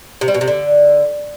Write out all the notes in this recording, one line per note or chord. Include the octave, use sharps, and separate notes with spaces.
C3
G3
B2
C3
D3